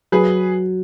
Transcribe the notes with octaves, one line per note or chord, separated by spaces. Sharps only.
F#3 G#4 B4